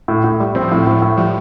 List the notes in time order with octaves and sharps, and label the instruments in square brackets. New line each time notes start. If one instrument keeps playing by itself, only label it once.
[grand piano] A2
A2
G3
[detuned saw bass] F3 [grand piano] C4
[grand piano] A2
A2
A2
[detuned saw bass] F3 [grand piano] G3